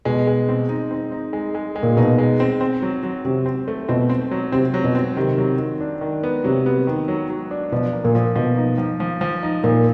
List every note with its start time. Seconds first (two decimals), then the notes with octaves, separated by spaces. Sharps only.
0.05 B2 G#3
0.27 G#3
0.49 C4
0.69 D#4
0.91 C4
1.12 D#4
1.33 G#3
1.55 G#3
1.76 G#3
1.83 A#2
1.97 B2 D#4
2.18 G#3
2.40 C4
2.61 C4
2.82 F#3
3.03 F#3
3.25 C3 F#3
3.46 C4
3.68 A3
3.89 B2 C4
4.10 C4
4.31 F#3
4.52 C3 C4
4.74 F#3
4.84 B2
4.95 C4
5.16 C3 D#3
5.38 F#3
5.58 D#3
5.81 D4
6.01 D#3
6.23 B3
6.44 C3 F#3
6.66 B3
6.87 D#3
7.08 F#3
7.30 F#3
7.51 D4
7.72 B2 F3
7.93 A#3
8.04 A#2
8.15 F3
8.35 B2 F3
8.57 D#4
8.78 F3
9.00 F3
9.21 F3
9.43 D#4
9.64 A#2 F3